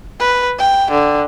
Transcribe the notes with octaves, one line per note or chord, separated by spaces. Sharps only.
B4
G5
D3